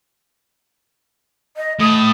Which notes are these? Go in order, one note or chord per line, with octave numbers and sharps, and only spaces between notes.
D#5
A2 D#6